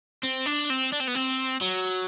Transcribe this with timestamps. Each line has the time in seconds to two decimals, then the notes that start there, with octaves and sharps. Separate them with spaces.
0.23 C4
0.46 D4
0.70 C4
0.93 D4
1.00 C4
1.08 B3
1.16 C4
1.61 F#3